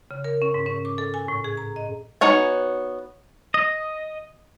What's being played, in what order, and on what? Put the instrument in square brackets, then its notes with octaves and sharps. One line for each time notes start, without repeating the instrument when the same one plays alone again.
[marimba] C#3
A#4
C#4
G#2
C#4
D6
A4
G#5
A2
G#4
A#5
D#5
[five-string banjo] B3 D#4 F#4 C#5 G#5
[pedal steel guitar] D#5